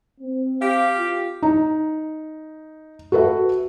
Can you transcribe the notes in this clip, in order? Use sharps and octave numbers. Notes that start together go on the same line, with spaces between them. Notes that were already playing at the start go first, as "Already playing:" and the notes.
C4
G4 F5
F4
D#4
F#4 A4 B4 E5